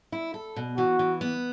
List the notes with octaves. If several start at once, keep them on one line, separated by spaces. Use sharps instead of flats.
E4
A4
B2
E3 F#4
E3
B3